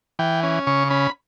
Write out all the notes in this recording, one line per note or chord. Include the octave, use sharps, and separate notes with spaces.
E3 G5
C#4
C#3 C#6
C#4 B5